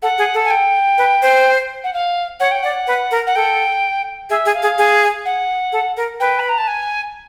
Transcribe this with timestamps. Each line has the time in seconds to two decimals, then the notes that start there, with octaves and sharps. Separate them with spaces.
0.02 A4 F#5
0.18 G#4
0.34 A4
0.45 G#5
0.50 G5
0.98 B4
1.22 C5
1.84 F#5
1.93 F5
2.40 C#5 F#5
2.51 G5
2.63 D5 F#5
2.87 B4
3.11 A#4
3.27 F#5
3.35 A4 G5
4.30 G#4 E5
4.46 G#4
4.54 F5
4.62 G#4
4.78 G#4
5.25 F#5
5.72 A4
5.97 A#4
6.20 B4 G5
6.39 B5
6.49 A#5
6.58 A5
6.67 G#5